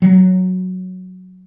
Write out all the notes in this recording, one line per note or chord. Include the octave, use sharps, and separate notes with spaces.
F#3